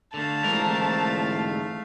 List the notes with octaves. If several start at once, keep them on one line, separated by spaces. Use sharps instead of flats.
D3 A3 F5 A5
G#2 E3 A#4